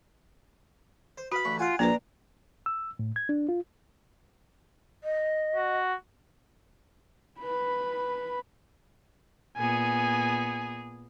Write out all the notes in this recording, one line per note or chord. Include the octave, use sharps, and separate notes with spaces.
C5
F#4 B4 F5 B5
A1 D2 C#6
F4 F5 F#5 G#5
A#1 A#3 D4 B4 D5 A#5 D6
E6
A2
G#6
D4
F4
D#5
F#4
B4 B5
A#2 B3 G#4 G#5